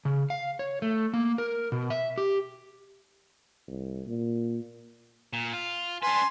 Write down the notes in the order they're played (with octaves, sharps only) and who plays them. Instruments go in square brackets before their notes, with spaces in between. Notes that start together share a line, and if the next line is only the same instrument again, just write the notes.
[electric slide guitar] C#3
F5
C#5
A3
A#3
A#4
B2
E5
G4
[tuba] C2
A#2
[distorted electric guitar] A#2
F4
[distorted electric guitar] D4 B4 [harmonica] G#5 C6